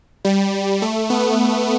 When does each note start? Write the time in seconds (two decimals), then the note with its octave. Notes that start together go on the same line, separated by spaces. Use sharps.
0.25 G3
0.82 A3
1.10 B3